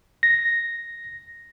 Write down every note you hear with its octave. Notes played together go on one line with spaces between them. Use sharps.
A#6